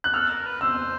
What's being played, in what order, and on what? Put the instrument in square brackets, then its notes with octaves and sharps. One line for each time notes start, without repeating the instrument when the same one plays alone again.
[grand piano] F#6
[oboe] A4 [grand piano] F6
[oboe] A#4
B4
[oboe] C5 [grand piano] E6